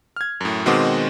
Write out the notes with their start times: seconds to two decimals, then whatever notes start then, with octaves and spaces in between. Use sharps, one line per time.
0.16 F6 G#6
0.41 F#2 A2
0.66 B2 D#3 G#3 C4 F#4 D6